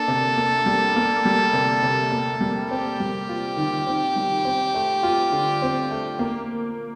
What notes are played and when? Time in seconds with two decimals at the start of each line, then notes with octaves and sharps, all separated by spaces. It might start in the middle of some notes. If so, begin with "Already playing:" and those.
Already playing: A#3 D4 A4
0.08 C3
0.37 A#3
0.66 G3
0.96 A#3
1.25 G3
1.53 C3
1.82 C3
2.12 A#3
2.41 G3
2.70 C4 G4
3.00 G3
3.29 F4
3.57 D#3
3.87 C4
4.16 G3
4.45 C4
4.74 A3
5.03 F4
5.32 D3
5.62 C4
5.91 A3
6.19 A#3